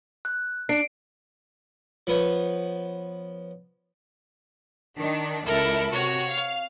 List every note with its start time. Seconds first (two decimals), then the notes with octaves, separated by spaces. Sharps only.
0.25 F#6
0.69 D4 C7 D7
2.07 F3 B3 C#5
4.97 D#3 D4
5.46 C#2 E4 A4 A#4
5.92 C3 F#4 C#5
6.28 F5